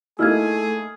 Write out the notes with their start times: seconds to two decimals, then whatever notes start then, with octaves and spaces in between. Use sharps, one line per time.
0.19 A3 A#3 D#4 E4 G#4 E6 F6 G#6